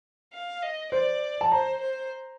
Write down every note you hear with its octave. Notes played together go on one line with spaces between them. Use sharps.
F5
D#5
C5 D5
A5
C5 A#5
C5